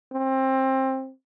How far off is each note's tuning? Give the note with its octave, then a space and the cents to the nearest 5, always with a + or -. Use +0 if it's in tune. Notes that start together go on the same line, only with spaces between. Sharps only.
C4 +20